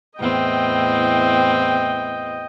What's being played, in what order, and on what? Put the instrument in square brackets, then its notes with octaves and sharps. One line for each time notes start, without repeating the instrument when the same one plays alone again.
[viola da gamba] E2 A2 C4 [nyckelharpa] D#5 G5